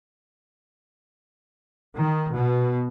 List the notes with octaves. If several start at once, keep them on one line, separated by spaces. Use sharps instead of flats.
D#3
B2